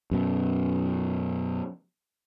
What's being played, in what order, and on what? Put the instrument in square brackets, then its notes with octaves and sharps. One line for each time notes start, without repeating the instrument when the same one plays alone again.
[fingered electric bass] F#2 B2